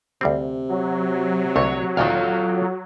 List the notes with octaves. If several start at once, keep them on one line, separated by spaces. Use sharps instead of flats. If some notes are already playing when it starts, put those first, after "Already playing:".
D2 C3 G3 C4
F#3
C2 D3 A3 C#5
D2 A#2 D#3 F4 A4 F5